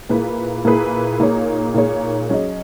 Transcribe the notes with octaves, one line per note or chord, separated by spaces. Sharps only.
A#2 A#3 E4 G#4 B4
A#2 A#3 E4 G#4 B4
A#2 A#3 D#4 G#4 C#5
A#2 A#3 D#4 G#4 C#5
F#3 C#4 G#4 D#5